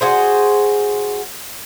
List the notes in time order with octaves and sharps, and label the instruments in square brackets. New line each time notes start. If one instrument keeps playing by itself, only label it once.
[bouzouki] F#4 G#4 C5